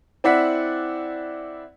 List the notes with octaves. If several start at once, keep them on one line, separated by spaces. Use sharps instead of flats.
C4 E4 D5 F#5 B6